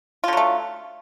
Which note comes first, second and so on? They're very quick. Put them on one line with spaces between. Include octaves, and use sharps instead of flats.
F4 D3 F#3 A3